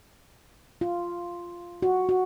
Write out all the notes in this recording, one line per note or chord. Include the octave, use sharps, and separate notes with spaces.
F4
F#4
F#4